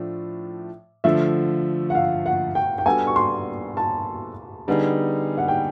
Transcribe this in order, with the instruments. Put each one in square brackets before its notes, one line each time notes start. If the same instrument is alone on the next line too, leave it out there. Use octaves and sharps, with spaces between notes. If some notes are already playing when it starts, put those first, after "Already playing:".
Already playing: [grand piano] A2 F3 A3 D4
[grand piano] D3 F3 A3 [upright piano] E5
[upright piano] F#5
F5
F#5
G5
G5
[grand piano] G3 B3 D4 F#4 A4 [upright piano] G#5
[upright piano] C#6
C6
A5
[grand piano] D3 G3 B3 D#4 G#4
[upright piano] F#5
G5